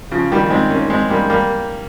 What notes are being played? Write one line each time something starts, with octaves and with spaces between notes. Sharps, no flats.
C#3 F3
D#3 G3
G#3 C4
A#3 C#4
G#3 C4
G3 A#3
G3 A#3